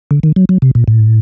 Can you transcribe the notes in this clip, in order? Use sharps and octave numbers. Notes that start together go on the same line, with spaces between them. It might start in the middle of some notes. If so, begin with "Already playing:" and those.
D3
D#3
F#3
F#3
C3
A#2
A2